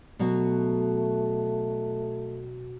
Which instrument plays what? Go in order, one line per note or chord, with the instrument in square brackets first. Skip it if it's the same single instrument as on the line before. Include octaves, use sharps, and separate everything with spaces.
[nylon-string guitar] B2 F#3 F#4 [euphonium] A3